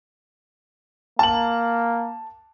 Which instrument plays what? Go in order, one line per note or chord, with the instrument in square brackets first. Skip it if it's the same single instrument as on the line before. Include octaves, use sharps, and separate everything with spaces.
[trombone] A#3 [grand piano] A5 F#7